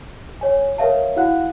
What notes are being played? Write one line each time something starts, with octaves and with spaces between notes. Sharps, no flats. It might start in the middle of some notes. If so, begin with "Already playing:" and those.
C#5 G#5
A#4 B4 C#5 E5 F5 A5
E4 F#4 F5 F#5 F#6